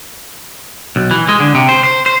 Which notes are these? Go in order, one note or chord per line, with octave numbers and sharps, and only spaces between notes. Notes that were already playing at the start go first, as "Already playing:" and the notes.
B1
E3
G#3
D3
C3
C5
C5
C5